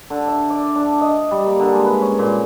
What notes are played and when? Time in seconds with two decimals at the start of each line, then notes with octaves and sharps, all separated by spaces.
0.10 D3
0.28 E5
0.50 D5
0.75 D4
1.01 D#5
1.31 G3
1.46 A#3
1.60 D3
1.72 G#3
1.85 B4
2.02 C#4
2.19 A#2